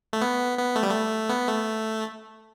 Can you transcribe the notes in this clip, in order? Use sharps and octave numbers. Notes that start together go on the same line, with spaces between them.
A3
B3
B3
A3
G3
A3
B3
A3